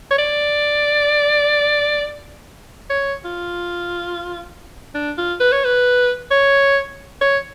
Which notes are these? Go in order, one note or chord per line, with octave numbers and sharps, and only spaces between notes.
C#5
D5
C#5
F4
D4
F4
B4
C#5
B4
C#5
C#5